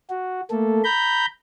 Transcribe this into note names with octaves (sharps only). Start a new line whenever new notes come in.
F#4
A3 A#3 A4
A#5 B5 G6